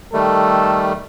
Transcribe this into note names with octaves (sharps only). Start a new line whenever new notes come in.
D#3 G3 A3 A4